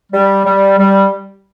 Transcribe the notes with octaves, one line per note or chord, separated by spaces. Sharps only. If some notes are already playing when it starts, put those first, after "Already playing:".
G3
G3
G3